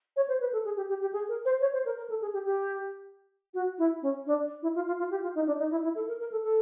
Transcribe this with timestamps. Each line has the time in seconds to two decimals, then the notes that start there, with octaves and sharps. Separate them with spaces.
0.16 C#5
0.28 C5
0.41 B4
0.52 A4
0.65 G#4
0.77 G4
0.89 G4
1.01 G4
1.13 G#4
1.29 A#4
1.45 C5
1.61 C#5
1.73 C5
1.85 A#4
1.97 A#4
2.09 A4
2.22 G#4
2.33 G4
2.45 G4
3.54 F#4
3.78 E4
4.02 C#4
4.26 D4
4.62 E4
4.75 F4
4.87 F4
4.99 F4
5.11 G4
5.23 F4
5.35 D#4
5.47 D4
5.59 D#4
5.71 E4
5.83 E4
5.95 A4
6.08 A#4
6.20 A#4
6.32 A4
6.43 A4